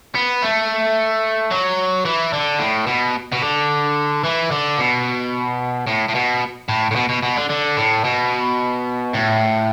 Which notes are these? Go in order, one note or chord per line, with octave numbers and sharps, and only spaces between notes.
B3
A3
F#3
E3
D3
A2
B2
B2
D3
E3
D3
B2
A2
A2
B2
A2
A2
B2
B2
B2
D3
D3
A2
B2
A2